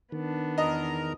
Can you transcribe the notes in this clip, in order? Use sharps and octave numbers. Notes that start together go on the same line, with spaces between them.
D#3 B3 D4
E2 A#4 D#5 A#5